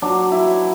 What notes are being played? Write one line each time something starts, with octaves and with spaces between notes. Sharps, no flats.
F#3 D4
E4
F#3